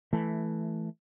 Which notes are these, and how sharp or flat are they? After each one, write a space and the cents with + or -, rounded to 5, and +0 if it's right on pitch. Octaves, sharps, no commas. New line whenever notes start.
E3 +0 A3 -10